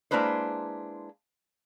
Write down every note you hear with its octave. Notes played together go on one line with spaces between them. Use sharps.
G#3 A#3 D4 E4 B4 C5